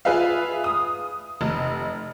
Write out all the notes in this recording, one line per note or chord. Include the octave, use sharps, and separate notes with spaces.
F4 G#4 B4 E5 F5
D#6
F1